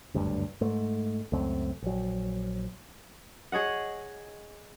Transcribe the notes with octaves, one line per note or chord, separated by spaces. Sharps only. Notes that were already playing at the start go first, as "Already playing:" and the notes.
F#1 D2 G2
G#2 A3
C#2 F#2 A3 C4
A#1 F#3
G#4 C#5 D#5 F#5